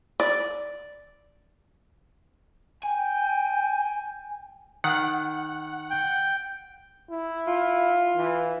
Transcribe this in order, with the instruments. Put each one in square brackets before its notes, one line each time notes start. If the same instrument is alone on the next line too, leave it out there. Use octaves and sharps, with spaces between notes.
[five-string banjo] D5
[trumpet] G5 [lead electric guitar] G#5
[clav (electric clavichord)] D#3 [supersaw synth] F#5
[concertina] G5
[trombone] E4
[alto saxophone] F4
[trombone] E3